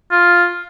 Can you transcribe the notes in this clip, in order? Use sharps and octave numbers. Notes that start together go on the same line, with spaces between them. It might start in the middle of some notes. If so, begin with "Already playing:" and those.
F4